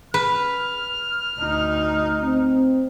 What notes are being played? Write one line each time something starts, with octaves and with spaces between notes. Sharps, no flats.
B4 F6
D2 D#4
C4